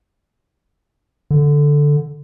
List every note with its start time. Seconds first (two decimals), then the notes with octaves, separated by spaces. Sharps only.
1.31 D3